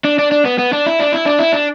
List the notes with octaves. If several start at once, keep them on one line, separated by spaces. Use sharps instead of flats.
D4
D4
D4
B3
B3
D4
E4
D4
E4
D4
E4
D4